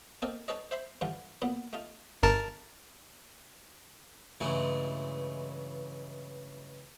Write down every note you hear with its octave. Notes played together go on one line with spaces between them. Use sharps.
A#3 C4 D#4 A4 A#4
D4 D#4 A4 B4 C#5 D#5
C5 E5 B5 C6
G2 D3 E3 F4
B1 A#2 B3 B5
A3 D#4 F4
G1 A#4 A5
G2 C#3 E3 F#3 G#3 A3